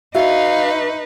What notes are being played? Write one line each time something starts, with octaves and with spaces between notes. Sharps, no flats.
D#4 F#4 B4 E5 F5